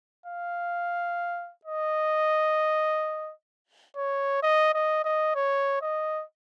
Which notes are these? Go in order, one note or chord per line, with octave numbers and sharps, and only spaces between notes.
F5
D#5
C#5
D#5
D#5
D#5
C#5
D#5